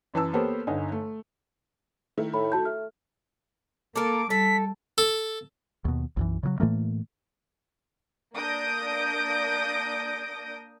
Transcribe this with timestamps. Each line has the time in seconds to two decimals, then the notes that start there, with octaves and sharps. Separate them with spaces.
0.14 F#2 E3 A5 E6
0.33 A#3 B3 G4 A4 C5 C#5
0.67 G1 D3 D#4 G#5
0.92 A3
2.17 D#3 A3 E4
2.34 A2 B5
2.52 F#4 A5 G6
2.65 A3 F6
3.96 A#3 A4 A#4 D6
4.30 G3 A4 B6
4.98 A4
5.85 D#2 B2
6.17 B1 F#2 E3
6.43 C#3 E3 F#3
6.60 A2 E3 A3 A#3
8.35 A#3 D4 D#6 G6 A#6 D7